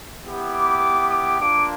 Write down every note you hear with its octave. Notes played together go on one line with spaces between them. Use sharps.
B3 E4 G4
D6
D6
A#3 D4 F4 D6